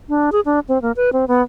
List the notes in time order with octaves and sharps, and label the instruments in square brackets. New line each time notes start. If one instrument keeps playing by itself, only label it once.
[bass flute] D4
G#4
D4
C4
A#3
B4
C4
B3